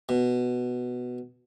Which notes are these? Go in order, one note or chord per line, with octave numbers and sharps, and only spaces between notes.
B2